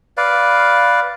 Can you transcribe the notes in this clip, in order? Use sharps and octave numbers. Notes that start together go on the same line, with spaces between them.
B4 D5 F5